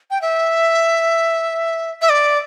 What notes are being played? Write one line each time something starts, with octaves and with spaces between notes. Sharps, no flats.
G5
E5
E5
D5